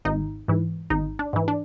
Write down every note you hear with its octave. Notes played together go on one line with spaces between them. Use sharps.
G#1 D#4
G#2 E3
G#1 D#4
D4
G#2 E3
D4